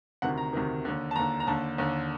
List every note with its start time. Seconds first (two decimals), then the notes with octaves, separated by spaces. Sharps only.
0.22 D2 C3 D#3 F#5
0.37 A#5
0.53 D2 C3 D#3
0.85 D#2 D3
1.11 A5
1.16 D#2 D3 A#5
1.40 A#5
1.47 D#2 D3 A5
1.78 D#2 D3